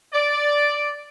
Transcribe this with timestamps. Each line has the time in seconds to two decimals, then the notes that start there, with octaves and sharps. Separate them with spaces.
0.14 D5